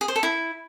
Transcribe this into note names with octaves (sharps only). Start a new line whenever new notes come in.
G#4
C5
A4
E4